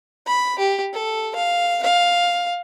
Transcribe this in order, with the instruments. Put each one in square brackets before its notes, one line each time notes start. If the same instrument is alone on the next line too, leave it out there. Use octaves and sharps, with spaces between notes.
[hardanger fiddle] B5
G4
A4
F5
F5